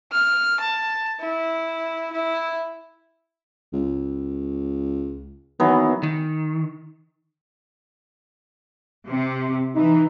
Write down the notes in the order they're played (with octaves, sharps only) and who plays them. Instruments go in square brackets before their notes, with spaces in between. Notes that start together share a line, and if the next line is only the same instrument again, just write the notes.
[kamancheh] F6
A5
E4
E4
[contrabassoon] C#2
[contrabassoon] D#3 [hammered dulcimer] E3 F#3 B3
[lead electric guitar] D#3
[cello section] C3
[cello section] E3 [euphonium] D#4